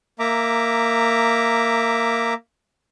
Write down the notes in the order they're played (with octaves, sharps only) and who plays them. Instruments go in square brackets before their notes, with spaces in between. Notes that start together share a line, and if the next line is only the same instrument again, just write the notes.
[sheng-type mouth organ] A#3 E5 A#5 D6